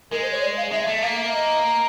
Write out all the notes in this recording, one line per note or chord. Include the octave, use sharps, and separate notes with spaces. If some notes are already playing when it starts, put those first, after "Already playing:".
G#3 A#4
C5
C#5
D5
F5
G#3 E5
A3 E5
A#3 F5
E5
D#5